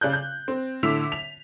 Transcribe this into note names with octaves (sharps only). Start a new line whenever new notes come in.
C#3 D5 F#6 G6
G6
C4
A2 D3 D6 E6 B6 F7
F7